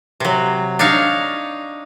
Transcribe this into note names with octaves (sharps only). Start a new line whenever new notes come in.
C3 F#3
D4 D#4 C#5 F5